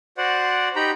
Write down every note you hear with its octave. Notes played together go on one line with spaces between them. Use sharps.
F#4 C5 D5 F#5
D#4 G4 G5 A#5 B5